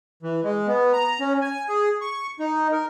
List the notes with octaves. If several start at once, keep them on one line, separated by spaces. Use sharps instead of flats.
E3
G#3
B3
A#5
C#4
G#5
G#4
C#6
D#4
A#4